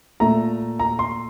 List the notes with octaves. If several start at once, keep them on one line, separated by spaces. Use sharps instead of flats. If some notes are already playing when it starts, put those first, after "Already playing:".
A#2 A3 A#5
A#5
C6